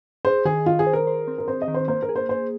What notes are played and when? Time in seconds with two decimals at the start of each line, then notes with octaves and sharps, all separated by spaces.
0.25 G#4 C5
0.45 D#3 G#4
0.66 D#3 F4
0.79 G#4
0.87 C5
0.93 A#4
1.07 C5
1.28 C4
1.38 A#4
1.48 C4 C5
1.62 D#5
1.68 D#3
1.74 C5
1.88 A#3 C5
2.03 A#4
2.09 G#4
2.16 C5
2.29 G#4 C5